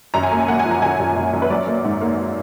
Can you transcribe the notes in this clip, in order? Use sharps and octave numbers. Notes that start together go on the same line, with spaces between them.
F#2 A#5
G#5
A#3 A#5
G#5
A#3 F#5
G#5
F3
A#5
F#2 G#5
F#2
F#2
F#2
B4
F#3 D5
A#3
G#2
A#3